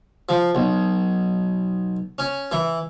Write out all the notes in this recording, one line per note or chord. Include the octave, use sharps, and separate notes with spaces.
F3
B1
C#4
E3